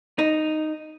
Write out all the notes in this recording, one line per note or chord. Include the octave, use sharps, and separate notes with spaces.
D#4